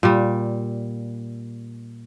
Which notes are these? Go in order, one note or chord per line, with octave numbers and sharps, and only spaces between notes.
A#2 G3